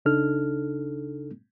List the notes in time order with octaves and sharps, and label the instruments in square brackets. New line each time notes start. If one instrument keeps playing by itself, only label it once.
[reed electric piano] C#2 C#3 D4 D#4 A4 F6